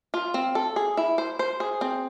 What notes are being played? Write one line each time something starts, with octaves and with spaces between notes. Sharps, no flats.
F4
C4
A4
G#4
E4
C5
C5
G#4
C4